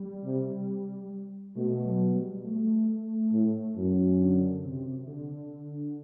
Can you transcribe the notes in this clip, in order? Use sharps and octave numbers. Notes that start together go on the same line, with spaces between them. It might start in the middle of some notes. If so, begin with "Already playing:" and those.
Already playing: G3
C3
B2 A3
A3
F#3
G3
A3
A2
F#2
D3
C3
D3